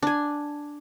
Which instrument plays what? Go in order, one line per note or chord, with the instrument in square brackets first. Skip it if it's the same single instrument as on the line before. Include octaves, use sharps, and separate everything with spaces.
[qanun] D4 G#5